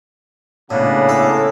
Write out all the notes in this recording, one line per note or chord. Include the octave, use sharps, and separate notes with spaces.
A2 C#3 A#3 B3 D4
A2 A4